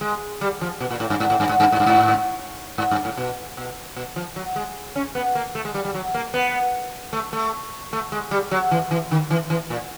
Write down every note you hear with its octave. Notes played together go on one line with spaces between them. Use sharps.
G#3
G3
F3
B2
A#2
A2
G2
G#2
A2
G2
G#2
G2
G#2
G2
G#2
G#2
G2
A2
B2
B2
B2
F3
F#3
G#3
C#4
B3
A#3
A3
G#3
G3
G3
F#3
A#3
B3
A3
A3
A3
G#3
G3
F#3
E3
E3
D#3
E3
E3
A#2